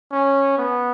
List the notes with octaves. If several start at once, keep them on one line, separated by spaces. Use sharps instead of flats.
C#4
B3